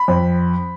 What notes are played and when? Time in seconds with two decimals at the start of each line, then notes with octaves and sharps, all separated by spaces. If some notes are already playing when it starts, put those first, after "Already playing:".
Already playing: B5
0.08 F2